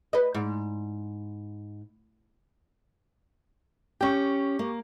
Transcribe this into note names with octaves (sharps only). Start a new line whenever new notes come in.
B4 D#5
G#2
C#4 G4 G5 C#6
A#3